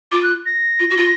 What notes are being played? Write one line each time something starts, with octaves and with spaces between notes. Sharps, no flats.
F4 D6
F#6
A#6
F4
F#4
F4